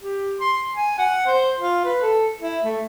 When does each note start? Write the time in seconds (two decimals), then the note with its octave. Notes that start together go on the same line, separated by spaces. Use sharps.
0.01 G4
0.40 C6
0.75 G#5
0.99 F#5
1.27 C5
1.59 F4
1.85 B4
2.02 A4
2.41 E4
2.64 A3